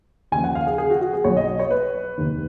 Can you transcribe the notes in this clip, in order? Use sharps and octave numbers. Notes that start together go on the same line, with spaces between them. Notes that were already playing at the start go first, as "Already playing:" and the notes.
D#2 C#3 F3 G#5
F#5
F5
G#4
G#4
F#4
F#4
G#4
B1 B2 F#3 C#5
D#5
D#5
C#5
B4
F1 D#2 D#3